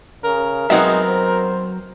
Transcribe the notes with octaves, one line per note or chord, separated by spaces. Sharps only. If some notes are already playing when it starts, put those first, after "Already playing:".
C#3 A#4
F#3 G#3 B3 C4 D#4 F#4 E5
C5